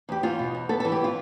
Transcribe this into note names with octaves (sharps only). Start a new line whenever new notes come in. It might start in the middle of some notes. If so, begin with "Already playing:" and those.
E2 G4
E2 F4
B2
E2
B3 A4
A4
E3
G4
B3 F4